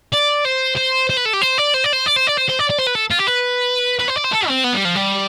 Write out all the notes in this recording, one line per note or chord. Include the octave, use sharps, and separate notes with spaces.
D5
C5
C5
C5
B4
A4
G4
C5
D5
C5
D5
C5
D5
C5
D5
C5
C5
D5
D5
C5
B4
A4
F4
G4
B4
B4
C5
D5
C5
A4
C4
B3
G3
F3
G3